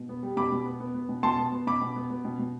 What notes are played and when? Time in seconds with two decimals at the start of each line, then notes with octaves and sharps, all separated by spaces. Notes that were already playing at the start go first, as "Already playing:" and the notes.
Already playing: B2
0.09 B3
0.23 G3
0.37 B2 B5 D6
0.52 B2
0.65 B3
0.80 B3
0.94 B3
1.09 B2
1.23 B2 A5 C6
1.38 B3
1.52 B3
1.67 B2 B5 D6
1.81 B2
1.96 B3
2.10 B3
2.25 B2
2.39 B2